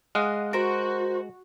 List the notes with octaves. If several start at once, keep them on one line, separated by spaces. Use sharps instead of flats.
G#3 D#5 F5 F#5
F#4 A#4 C5